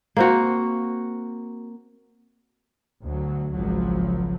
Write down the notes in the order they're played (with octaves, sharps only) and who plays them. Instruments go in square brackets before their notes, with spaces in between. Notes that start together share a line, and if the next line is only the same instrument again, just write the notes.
[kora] A#3 C4 F#4
[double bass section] D2 F#3
G#1 C#2 F3 F#3